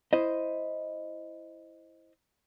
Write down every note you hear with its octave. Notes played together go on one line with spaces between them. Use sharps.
E4 C5 D#5